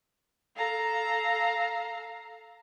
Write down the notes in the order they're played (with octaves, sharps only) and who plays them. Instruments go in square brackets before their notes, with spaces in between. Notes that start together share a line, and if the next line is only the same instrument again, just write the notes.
[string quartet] A4 F5 A#5